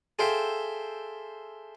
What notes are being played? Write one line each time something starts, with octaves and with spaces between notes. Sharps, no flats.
G#4 A4 C5 E5 F5 G5